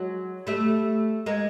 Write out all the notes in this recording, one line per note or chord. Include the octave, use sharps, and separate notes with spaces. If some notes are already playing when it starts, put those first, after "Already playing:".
Already playing: F#3 G#3
G3 A3
G#3 A#3